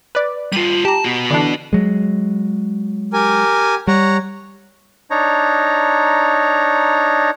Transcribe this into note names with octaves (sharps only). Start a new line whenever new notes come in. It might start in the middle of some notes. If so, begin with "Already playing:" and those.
B4 D5
G3 F4 D#7
G4 A5 A#5
B3 F#4
D3 E3 D4
F#3 G#3
G4 A#4 G#5
G3 C#5 F#5 A#5
D4 D#4 C#5 A#5